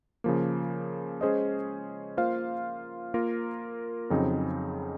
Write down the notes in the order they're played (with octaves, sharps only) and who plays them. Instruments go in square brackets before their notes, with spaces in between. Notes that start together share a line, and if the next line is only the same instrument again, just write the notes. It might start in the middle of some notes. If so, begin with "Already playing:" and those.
[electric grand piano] C#3 F3 A#3
G#3 C#4 G#4 C5 D#5
A#3 F4 C5 F5
A#3 F4 A#4
F2 C#3 F#3 C4 D#4